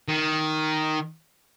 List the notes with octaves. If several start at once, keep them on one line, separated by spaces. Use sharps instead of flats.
D#3